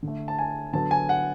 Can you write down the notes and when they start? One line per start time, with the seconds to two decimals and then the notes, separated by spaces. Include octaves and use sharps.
0.03 D3
0.08 A3
0.28 A5
0.39 G#5
0.73 D3 F#3 B3 A5
0.91 G#5
1.09 F#5